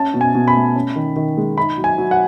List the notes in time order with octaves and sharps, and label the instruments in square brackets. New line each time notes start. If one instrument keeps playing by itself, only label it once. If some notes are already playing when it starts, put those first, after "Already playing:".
Already playing: [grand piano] C#4 A5
B2
G#5
B2
B5
A3
C#4
D#3
D#3
G#3
D#4 B5
F#3
G#5
F#3
F#5